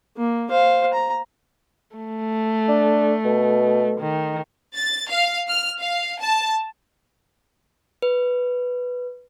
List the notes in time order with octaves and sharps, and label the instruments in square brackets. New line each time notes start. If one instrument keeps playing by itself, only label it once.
[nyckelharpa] A#3
C5 F5
A#5
[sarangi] A3
[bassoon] D4
B2
[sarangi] D#3
[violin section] A6
F5
F6
F5
A5
[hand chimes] B4